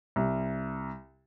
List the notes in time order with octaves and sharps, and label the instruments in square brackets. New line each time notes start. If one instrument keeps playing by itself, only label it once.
[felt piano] C2